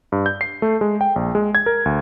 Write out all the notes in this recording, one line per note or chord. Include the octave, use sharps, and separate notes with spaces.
G2
G6
C7
A3
G#3
G5
A#1
G#3
G#6
A#4
D2